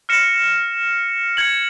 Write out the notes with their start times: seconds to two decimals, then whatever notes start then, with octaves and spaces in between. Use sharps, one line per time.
0.09 F6 A#6 C#7 E7
1.37 G#6 C#7 F#7